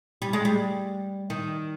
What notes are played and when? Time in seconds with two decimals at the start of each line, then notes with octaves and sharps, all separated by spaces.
0.22 G3
0.33 G#3
0.45 G3
1.30 D#3